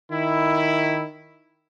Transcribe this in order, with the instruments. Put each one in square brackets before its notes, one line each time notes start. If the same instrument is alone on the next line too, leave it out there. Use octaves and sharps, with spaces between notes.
[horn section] D#3 E4